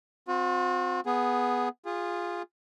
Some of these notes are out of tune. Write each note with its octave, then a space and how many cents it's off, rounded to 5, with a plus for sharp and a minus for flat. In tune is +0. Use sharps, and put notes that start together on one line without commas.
C4 -5 F#4 -45
B3 +0 G#4 +0
F4 +0 G#4 -25